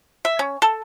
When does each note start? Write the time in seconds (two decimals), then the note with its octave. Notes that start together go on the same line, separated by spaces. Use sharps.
0.25 E5
0.39 C#4
0.62 A4